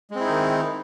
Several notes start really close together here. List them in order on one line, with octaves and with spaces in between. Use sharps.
G#3 C4 E4 D#4 D#3